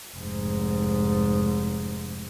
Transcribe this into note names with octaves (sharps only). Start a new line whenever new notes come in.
F1 G#2